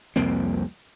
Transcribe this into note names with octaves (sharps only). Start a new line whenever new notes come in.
C2 F2 A#3 C4